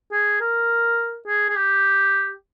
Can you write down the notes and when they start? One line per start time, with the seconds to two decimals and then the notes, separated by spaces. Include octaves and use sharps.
0.12 G#4
0.41 A#4
1.27 G#4
1.49 G#4
1.56 G4